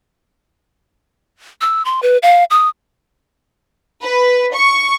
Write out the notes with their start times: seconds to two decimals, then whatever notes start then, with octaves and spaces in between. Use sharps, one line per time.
1.61 E6
1.85 C6
2.03 B4
2.23 F5
2.50 D#6
4.03 B4
4.53 C#6